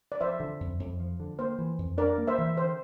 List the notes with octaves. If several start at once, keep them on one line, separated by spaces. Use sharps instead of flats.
D5
F3 C5 E5
D3
F2
F2
F3
D3
A#3 C5
E3
F2
D4 A#4 D5
A#3
C5 E5
E3
D3 C5